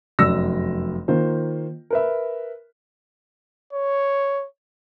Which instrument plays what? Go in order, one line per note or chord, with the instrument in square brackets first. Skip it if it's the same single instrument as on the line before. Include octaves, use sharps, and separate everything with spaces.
[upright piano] F1 F#2 D5 E6 A#6
D#3 A#3 F4 C5
A#4 B4 E5
[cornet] C#5